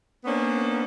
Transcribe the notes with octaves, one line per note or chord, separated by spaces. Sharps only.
A#3 B3 C#4 D4 C5